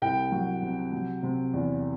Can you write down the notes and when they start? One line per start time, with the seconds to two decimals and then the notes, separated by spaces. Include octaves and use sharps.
0.02 C2 G5
0.32 F#3
0.62 C3
0.93 F#3
1.23 C3
1.53 E2